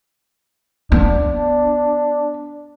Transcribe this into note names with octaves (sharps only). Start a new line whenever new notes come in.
B3 D4